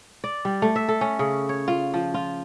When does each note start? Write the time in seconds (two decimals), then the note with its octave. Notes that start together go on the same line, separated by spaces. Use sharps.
0.24 D5
0.45 G3
0.62 A3
0.76 E5
0.88 A4
1.01 C#4
1.19 C#3
1.49 C#5
1.68 F4
1.94 F3
2.14 F4